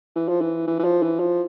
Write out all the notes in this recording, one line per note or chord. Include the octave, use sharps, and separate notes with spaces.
E3
F3
E3
E3
E3
F3
E3
F3